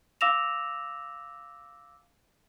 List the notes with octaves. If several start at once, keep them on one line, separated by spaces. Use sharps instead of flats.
F5 D6 E6 A#6 E7 F7